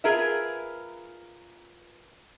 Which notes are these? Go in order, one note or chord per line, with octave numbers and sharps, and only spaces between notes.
F4 G#4 A#4 B4 E5